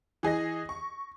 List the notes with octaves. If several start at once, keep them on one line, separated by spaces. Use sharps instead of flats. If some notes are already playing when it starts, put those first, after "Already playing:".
E3 G#4 D#5 A#6
C#6